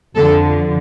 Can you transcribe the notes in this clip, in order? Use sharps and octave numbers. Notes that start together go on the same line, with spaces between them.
F2 D3 F3 A4